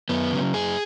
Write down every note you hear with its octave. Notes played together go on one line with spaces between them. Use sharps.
F#2 B3
C#3 F#3
F#2 G#4